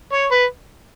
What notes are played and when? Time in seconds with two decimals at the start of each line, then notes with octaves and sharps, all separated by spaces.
0.13 C#5
0.31 B4